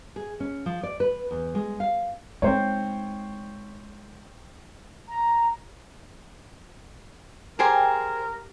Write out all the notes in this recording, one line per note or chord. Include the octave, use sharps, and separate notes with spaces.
G#4
C#4
F3
D5
B4
E2
G#3
F5
G#3 C4 D#4 C5 C#5
A#5
G4 G#4 A#4 C5 G5 G#5 A#5